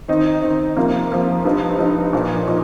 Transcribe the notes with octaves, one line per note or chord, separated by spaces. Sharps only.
D#3 C4 D#4
D#3 C4 D#4
C3 F3 A#3 F4
C3 F3 A#3 F4
G2 F3 D#4
G2 F3 D#4
A#2 F3 D#4
A#2 F3 D#4